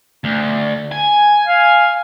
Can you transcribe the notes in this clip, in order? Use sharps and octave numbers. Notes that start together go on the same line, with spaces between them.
D2
G#5
F5